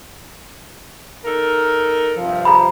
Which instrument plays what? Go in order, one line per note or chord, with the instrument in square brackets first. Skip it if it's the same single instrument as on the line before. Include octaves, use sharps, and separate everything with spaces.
[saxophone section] D#4 A4 A#4
G2 C3 F3
[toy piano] A#5 B5